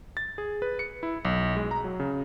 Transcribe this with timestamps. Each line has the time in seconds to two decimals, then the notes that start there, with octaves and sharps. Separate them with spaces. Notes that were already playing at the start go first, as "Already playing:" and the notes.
0.17 A6
0.38 G#4
0.62 B4
0.79 C#7
1.03 E4
1.25 B1
1.56 G#3
1.71 A#5
1.84 F#3
2.00 C#3